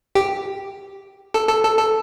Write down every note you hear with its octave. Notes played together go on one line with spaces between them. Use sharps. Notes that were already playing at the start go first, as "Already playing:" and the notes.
G4
A4
A4
A4
A4